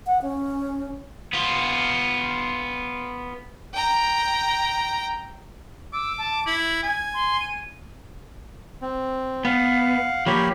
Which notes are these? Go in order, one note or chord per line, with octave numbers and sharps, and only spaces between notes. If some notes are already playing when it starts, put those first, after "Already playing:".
F#5
C#4
B3 F4
G5 A#5
D6 E6
A5
E4 F#7
G#5 G#6
C6
D#7
C4
B3 F5 F#5
F3 A#3 G4 C#5 B5